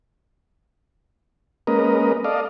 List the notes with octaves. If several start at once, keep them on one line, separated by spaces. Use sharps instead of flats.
G#3 A#3 C#4 A#4 B4 D#5
A4 D5 D#5 F5